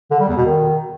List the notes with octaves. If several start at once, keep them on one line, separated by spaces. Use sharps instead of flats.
D3
G3
E2
B2
D#3